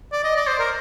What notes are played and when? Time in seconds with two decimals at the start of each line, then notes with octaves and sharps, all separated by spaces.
0.12 D5
0.24 D#5
0.36 D5
0.48 C5
0.59 A#4